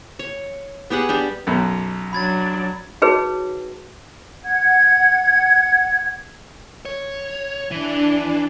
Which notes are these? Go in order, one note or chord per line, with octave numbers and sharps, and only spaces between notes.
C#5
B3 G4 G#4 F#5
G3 D4 G4
B1 F#2 B2
F#3 D4 B5 G#6 A6
D#4 F#4 G#4 B4 C#5
F#5 G#6
C#5
E3 D4